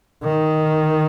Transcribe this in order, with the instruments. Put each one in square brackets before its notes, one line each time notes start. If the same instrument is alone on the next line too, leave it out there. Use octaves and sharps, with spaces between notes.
[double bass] D#3